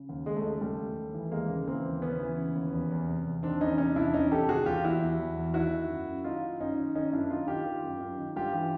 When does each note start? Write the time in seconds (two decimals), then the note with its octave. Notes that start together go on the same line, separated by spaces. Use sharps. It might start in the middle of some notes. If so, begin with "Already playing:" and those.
Already playing: C#3
0.09 D#2
0.26 D#2 G#3
0.36 A3
0.44 C#3 G#3
0.61 D#2 G3 A3
0.79 D#2
0.97 D#2
1.14 E3
1.32 D#2 G#3 A#3
1.49 C#3
1.67 E3 A#3 C4
1.85 D#2
2.02 C#3 B3 C#4
2.19 E3
2.38 C#3
2.55 D#2
2.73 E2
2.91 E2
3.08 C3
3.25 E2
3.43 D#3 C4 D4
3.60 E2 C#4 D#4
3.78 C3 C#4 D#4
3.96 E2 D4 E4
4.14 E2 C#4 D#4
4.31 C3 G4 A4
4.48 D#3 F#4 G#4
4.66 E2 F4 G4
4.84 E2 E4 F#4
5.01 E2
5.19 E2
5.37 E2
5.54 D#3 E4 F#4
5.72 D#3
5.90 F#2
6.07 F#2
6.24 D#3 D#4 F4
6.43 D#3
6.60 F#2 C#4 D#4
6.78 D#3
6.95 D#3 C#4 D#4
7.13 F#2 D4 E4
7.30 D#3 D#4 F4
7.48 D#3 F4 G4
7.66 D#3
7.83 F#2
8.00 F#2
8.18 D#3
8.36 G2 F4 G4
8.53 E3